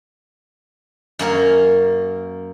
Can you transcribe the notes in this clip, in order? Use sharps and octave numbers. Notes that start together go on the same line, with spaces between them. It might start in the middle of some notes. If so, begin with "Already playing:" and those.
F#2 A#3 A#4